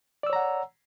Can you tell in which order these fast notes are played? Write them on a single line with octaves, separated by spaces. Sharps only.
D5 E6 C#5 A#5 F#5